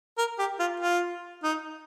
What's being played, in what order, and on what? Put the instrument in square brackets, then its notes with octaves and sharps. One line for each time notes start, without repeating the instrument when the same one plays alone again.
[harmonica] A#4
G4
F4
F4
D#4